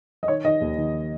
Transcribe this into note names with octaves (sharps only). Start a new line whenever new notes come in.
D#5
D#3 C#5
D#3 D#5
D#2
D#3